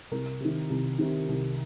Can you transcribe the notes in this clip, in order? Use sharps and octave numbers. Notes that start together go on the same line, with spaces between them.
C2 A#4
C3 D#3
C2
C3 D#3
C2